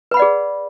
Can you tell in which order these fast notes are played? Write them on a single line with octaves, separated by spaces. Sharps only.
B4 B5 F#5 D5 G#4